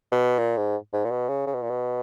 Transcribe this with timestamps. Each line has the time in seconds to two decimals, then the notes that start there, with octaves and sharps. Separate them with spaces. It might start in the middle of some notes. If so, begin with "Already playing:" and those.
0.12 B2
0.39 A#2
0.57 G#2
0.93 G#2
1.04 A#2
1.11 B2
1.29 C#3
1.47 C#3
1.54 B2
1.62 A#2
1.70 B2